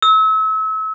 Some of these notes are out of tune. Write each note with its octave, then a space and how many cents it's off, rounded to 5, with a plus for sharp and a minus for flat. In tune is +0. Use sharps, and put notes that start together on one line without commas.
E6 -35